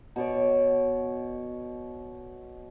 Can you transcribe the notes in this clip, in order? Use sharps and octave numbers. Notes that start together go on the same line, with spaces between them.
B2 C#5 D5